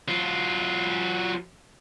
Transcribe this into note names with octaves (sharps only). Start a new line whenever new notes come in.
F#3 F4